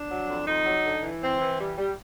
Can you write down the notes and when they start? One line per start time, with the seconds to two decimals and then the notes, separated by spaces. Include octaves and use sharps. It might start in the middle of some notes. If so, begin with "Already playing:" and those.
Already playing: D4
0.09 F#3
0.28 F2
0.46 F2 D#4
0.65 F#3
0.83 D3
1.02 E3
1.21 C4
1.39 E3
1.59 G3
1.78 G3